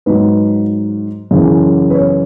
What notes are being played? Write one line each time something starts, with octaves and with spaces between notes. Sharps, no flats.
G#2 F#3 B4
F#2 C#3 E3
B4
C#5